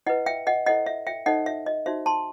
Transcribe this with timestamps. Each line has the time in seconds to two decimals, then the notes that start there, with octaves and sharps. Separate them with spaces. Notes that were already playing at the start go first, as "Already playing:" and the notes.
0.07 E4 B4 D#5 F#5
0.26 E5 G5
0.47 D#5 F#5
0.66 E4 A4 C5 D#5 F#5
0.86 E5
1.07 E5 G5
1.26 D#4 A4 C5 D#5 F#5
1.46 E5
1.66 D#5
1.86 D#4 F#4 C5 E5
2.06 A5 C6